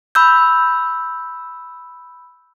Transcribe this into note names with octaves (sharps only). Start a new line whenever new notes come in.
B5 E6 G6